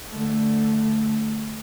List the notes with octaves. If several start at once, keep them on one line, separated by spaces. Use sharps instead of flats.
D3 A3